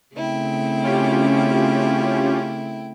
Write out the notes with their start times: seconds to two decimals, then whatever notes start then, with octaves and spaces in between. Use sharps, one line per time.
0.16 C#3 A3 C4 E4 G5
0.84 C#4 F4 G4